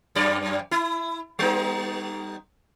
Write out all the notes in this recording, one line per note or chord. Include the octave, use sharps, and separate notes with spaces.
F#2 D5
E4
G3 B3 D#4